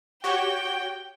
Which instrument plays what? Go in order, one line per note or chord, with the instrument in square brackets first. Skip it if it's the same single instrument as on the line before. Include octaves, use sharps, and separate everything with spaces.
[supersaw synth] F#4 G4 C#5 [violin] G5